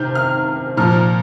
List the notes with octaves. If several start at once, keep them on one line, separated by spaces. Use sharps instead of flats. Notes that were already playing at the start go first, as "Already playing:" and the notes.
Already playing: C3 D#3 F6 G6
F6
A#2 F3 F6